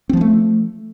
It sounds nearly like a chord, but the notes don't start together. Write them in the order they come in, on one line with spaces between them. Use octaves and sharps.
C4 F3 B3 A3